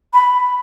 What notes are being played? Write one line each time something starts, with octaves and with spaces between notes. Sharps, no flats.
B5